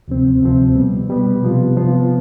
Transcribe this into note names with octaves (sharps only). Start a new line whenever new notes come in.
D2 C3 F3 C4
D2 C3 F3 C4
B2 G3 B3
B2 G3 B3
C3 F3 B3 F4
C3 F3 B3 F4